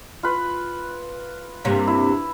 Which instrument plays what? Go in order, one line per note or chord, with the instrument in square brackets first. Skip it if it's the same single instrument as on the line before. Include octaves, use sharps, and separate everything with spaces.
[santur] F4 B4
[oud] G2 C3 A#3
[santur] E4